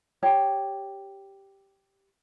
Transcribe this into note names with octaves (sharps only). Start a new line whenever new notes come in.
G4 C#5 A5